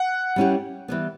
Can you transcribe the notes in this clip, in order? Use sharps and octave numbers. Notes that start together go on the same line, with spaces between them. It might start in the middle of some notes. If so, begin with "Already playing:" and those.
Already playing: F#5
G3 C#4 E4 G4
E3 G3 B3